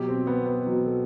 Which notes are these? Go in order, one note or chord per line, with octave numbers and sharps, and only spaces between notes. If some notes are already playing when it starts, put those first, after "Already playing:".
Already playing: B2 F#3 G4
C4
B3
B3
B2 F#3
A4